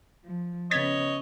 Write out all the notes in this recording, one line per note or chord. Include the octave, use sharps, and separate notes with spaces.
F3
C#3 B3 C#5 D#5 G#6 A6 B6